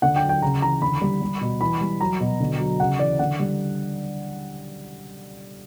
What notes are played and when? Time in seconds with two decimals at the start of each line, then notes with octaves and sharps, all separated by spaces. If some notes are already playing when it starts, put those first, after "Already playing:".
0.02 D3 F#5
0.16 G5
0.23 F#3
0.29 G5
0.42 C#3 A#5
0.62 E3 A#5
0.82 D3 B5
1.01 G3
1.22 G3
1.41 B2
1.61 E3 B5
1.81 G3
2.01 F#3 A#5
2.20 B2
2.40 D3
2.60 F#3
2.80 C#3 F#5
2.99 E3 D5
3.19 D3 F#5
3.39 G3